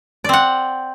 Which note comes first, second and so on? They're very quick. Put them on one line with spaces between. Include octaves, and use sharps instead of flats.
D5 C4 F#5